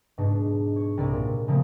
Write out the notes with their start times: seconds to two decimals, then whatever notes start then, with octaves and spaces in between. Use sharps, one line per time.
0.18 G#2 B2 D4
0.76 C#5
0.97 C2 C3 G3 D5
1.12 A#2
1.48 C#3 F3 A3 A#3 C4